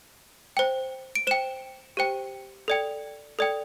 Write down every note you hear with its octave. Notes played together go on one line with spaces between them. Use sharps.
C5 G5
D7
C5 G5 E7
G4 C5 G5
A4 D5 G5
A4 D5 G5